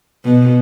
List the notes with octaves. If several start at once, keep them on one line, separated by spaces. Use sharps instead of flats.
B2